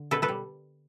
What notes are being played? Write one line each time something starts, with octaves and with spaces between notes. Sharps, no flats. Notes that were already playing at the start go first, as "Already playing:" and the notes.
Already playing: D3
B2 A4 B4
A4 B4
G3